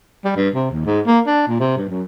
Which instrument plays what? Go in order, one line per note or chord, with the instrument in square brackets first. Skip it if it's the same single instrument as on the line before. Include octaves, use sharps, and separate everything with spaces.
[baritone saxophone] G3
G2
C3
D#2
G#2
A#3
D4
A#2
C3
G2
F#2